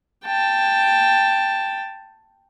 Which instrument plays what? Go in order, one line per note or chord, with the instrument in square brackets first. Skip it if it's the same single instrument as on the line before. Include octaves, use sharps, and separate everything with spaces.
[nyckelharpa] G5 A5